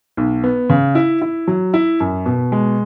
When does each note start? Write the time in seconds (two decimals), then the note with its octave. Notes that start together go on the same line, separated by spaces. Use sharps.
0.17 B1
0.44 B3
0.69 C#3
0.95 E4
1.22 E4
1.48 F#3
1.74 E4
2.00 F#2
2.26 B2
2.52 G#3